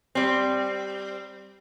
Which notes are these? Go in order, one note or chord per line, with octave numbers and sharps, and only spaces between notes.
G3 C4